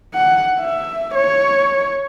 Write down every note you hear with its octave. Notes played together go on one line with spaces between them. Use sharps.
F#5
E5
C#5